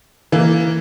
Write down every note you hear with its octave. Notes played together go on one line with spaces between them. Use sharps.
E3 A#3